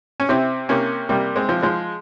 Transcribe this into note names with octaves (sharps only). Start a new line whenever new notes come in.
C#4
C3 C4 E4
C3 A#3 C#4
C3 G3 A#3
G#3 C4
F3
F3 G#3